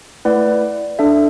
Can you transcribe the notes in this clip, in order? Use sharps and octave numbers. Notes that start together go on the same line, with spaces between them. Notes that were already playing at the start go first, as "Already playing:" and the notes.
A3 E4 B4 D5 F#5
D4 A4 E5